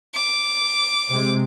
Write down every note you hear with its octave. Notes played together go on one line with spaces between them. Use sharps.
D6
C3 G#3